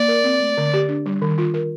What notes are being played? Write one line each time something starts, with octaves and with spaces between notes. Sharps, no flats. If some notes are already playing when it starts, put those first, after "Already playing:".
Already playing: A#3 D5
A#4
C4
A3
D3
G4
D4
G3
D#3
F4
A#4